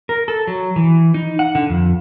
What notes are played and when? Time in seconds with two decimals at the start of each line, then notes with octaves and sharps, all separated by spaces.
0.09 A#4
0.28 A4
0.47 F#3
0.76 E3
1.14 D#4
1.39 F#5
1.55 D3
1.69 F2